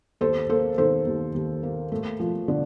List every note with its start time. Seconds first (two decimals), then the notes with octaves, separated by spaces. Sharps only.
0.21 D#2 A4 C5
0.50 A#3 A4 C5
0.78 D#3 A4 C5
1.07 D#2
1.34 D#2
1.63 A#3
1.92 A3
2.20 F3
2.48 D3